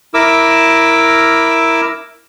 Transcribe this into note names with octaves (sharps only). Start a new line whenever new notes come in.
E4 A#4 D6 E6